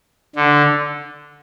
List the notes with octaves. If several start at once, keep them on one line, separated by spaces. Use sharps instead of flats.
D3